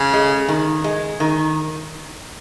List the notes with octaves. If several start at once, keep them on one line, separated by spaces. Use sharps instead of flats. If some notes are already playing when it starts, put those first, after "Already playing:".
Already playing: C#3
G#3
D#3
G#3
D#3